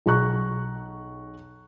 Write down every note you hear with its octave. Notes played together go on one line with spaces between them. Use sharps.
B1 G#4 A#5 C#6 F#6